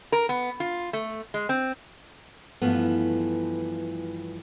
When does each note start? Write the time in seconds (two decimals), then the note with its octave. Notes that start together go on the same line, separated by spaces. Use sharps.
0.12 A#4
0.29 B3
0.60 F4
0.93 A3
1.34 G#3
1.49 C4
2.62 G2 E3 F3 A3 B3